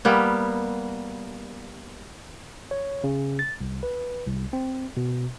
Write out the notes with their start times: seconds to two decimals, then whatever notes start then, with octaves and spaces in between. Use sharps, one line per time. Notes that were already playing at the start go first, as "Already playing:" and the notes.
0.05 G3 A#3 B3
2.71 C#5
3.04 C#3
3.39 A6
3.61 C2
3.83 B4
4.26 C2
4.53 C4
4.97 B2